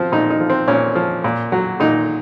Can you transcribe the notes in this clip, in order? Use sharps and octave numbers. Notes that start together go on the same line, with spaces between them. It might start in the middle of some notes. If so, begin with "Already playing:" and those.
Already playing: F3 C4
A#2 D#4
D#4
F3
C4
A#2 C#4
F3
A#2
F#3
A#2 D#4